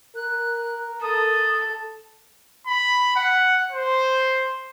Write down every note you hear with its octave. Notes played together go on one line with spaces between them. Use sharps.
A#4 F#6
A4 D#6
B5
F#5
C5